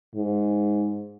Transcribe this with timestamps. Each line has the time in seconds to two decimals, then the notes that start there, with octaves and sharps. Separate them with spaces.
0.15 G#2